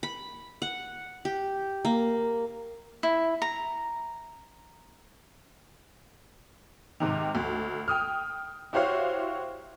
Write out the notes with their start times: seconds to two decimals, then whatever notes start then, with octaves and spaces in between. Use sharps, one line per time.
0.03 B5
0.62 F#5
1.25 G4
1.85 A#3
3.03 E4
3.42 A#5
7.00 G#2 C3 D#3
7.35 D2
7.88 G5 D#6 F6
8.73 E4 F#4 G4 C5 C#5 F5